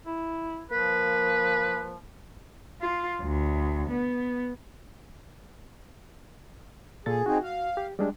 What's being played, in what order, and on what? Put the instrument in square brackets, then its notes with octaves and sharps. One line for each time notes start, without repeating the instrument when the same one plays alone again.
[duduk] E4
[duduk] F3 [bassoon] A#3 [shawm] B4
[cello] F4
D2
B3
[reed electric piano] A#2 A4 A6 [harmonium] G#4
[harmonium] C4 D#4 G#4 [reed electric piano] F#4
[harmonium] F5
[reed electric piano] G4
G3 G#3 D4